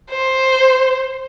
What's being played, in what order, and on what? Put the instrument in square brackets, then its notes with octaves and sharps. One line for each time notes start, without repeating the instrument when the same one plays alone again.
[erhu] C5